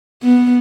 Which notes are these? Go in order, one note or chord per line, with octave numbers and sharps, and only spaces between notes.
B3